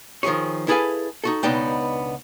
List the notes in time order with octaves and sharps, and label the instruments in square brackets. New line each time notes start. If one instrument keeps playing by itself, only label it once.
[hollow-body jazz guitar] D#3 F3 A3 G#4 C#5
E4 G#4 A4 B4 F5 G#5
D#4 F#4 A4
C#2 B2 B3 D4 D#4 G5